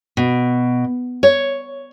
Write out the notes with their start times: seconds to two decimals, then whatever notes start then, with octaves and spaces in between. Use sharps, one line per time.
0.17 B2
1.23 C#5